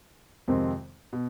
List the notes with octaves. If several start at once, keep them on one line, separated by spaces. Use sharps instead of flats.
F2 C3 D#3 G#3 C4
B2